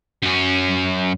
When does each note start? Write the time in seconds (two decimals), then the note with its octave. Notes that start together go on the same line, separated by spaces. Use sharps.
0.22 F#2 C#4